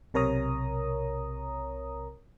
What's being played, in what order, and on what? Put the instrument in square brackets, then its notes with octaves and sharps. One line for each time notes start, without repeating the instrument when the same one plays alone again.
[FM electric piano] B1 C3 A#4 C#5 A#5 D#6